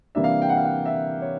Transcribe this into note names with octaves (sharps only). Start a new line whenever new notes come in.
C3 E3 G3 A#3 D4 E5
F5
G5
F#5
F5
F#5
E5
C#5